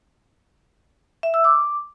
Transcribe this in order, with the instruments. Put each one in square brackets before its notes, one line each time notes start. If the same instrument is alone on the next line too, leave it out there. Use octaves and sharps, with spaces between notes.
[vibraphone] E5
E6
D6